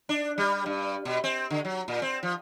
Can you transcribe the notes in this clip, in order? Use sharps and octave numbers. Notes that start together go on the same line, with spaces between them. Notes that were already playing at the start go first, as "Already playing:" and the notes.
D4
G3
G2
B2
C4
D3
F#3
A#2
C4
F3